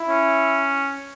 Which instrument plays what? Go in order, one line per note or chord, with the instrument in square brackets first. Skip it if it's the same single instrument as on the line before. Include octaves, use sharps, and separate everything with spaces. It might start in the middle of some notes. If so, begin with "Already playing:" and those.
Already playing: [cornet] E4
[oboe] C#4